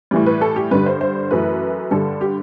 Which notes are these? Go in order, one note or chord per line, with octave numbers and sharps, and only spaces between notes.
A2 E3 G3
B4
A4
G4
G2 D3 G3 B4
C5
C5
F#2 E3 A3 B4
G2 D3 G3 A4
G4